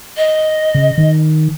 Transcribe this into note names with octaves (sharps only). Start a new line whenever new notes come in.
D#5
C#3
D#3